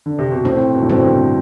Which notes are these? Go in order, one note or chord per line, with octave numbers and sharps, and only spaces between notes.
D3
C3
B2
A2 C4
B2
A2
G2 B2 C4
B2 D3